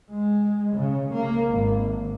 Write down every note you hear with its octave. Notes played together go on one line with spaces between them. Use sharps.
G#3
C#3
A#3
G#1